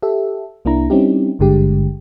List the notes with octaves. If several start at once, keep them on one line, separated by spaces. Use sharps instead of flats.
G4 A4 E5
C2 A#3 D4 E4 A#5
G3 C4 C#4 D#4 E4 G4
G#1 G2 D3 G#3 G4